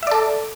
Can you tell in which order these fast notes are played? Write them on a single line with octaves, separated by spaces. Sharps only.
E5 D5 A4